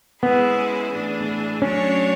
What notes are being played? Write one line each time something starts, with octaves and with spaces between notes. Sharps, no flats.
G#3 B3 C#4 E4 G#4
A2 E3 A3 D4 G#4
F#3 A3 C#4 D4 F#4 C#5